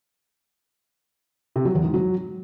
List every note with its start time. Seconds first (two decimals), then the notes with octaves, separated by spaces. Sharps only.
1.56 C3
1.65 F#3
1.75 E2
1.84 G#2
1.94 F#3